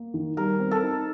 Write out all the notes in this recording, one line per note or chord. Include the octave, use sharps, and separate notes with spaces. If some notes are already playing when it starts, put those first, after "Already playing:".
Already playing: A#3
D#3
G3 A#4
C4
A4
D#4